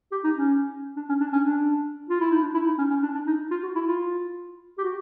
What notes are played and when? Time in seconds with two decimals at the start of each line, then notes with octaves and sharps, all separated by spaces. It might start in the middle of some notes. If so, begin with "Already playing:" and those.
0.12 G4
0.24 D#4
0.36 C#4
0.96 D4
1.09 C#4
1.21 D4
1.33 C#4
1.45 D4
2.10 F4
2.20 E4
2.31 D#4
2.42 D4
2.54 E4
2.66 D#4
2.78 C#4
2.90 C#4
3.03 D4
3.15 D4
3.27 D#4
3.51 F4
3.63 F#4
3.75 E4
3.88 F4
4.78 G4
4.84 F#4